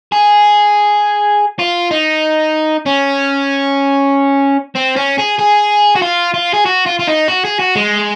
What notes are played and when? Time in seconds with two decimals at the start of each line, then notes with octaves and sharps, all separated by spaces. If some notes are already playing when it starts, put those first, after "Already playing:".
0.12 G#4
1.59 F4
1.91 D#4
2.86 C#4
4.76 C4
4.96 C#4
5.18 G#4
5.39 G#4
5.96 F#4
6.02 F4
6.34 F4
6.54 G#4
6.66 F#4
6.86 F4
6.99 F4
7.07 D#4
7.28 F#4
7.45 G#4
7.59 F#4
7.75 G#3